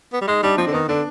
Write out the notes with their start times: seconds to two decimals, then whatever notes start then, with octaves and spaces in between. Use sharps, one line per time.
0.13 B3
0.21 G3
0.27 G#3 D#4
0.43 G3 D4
0.58 F3 C4
0.67 D3
0.73 D#3 B3
0.88 D3 D4